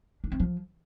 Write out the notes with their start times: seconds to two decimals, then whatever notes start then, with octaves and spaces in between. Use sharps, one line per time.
0.24 D4
0.32 C4
0.40 F3